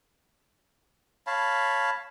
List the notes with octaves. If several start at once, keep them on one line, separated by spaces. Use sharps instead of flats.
C#5 F5 A5 B5